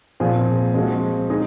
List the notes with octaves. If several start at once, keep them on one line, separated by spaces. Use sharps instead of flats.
A#2 F3 C4 F4 G#4
F3 G#3 C4 F#4
G#3 D#4 G#4